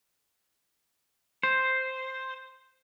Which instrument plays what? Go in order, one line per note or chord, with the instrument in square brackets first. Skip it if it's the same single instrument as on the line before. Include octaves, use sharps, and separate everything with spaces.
[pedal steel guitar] C5